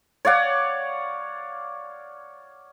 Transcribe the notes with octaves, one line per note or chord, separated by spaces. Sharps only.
C#5 D5 F5 F#5